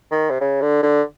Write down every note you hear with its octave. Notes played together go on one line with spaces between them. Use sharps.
D#3
C3
C#3
D3
D3